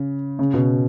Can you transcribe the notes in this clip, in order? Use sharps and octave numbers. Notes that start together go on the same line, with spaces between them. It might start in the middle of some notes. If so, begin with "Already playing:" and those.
Already playing: C#3
C#3
B2